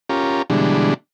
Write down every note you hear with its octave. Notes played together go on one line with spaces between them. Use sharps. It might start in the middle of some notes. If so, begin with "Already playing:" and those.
C#4 F4 G4 A#4
B2 D3 E3 G3 G#3 D4